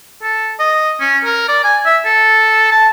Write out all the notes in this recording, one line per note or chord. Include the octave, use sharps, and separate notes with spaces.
A4
D#5
C#4
A#4
D5
G#5
E5
A4
A5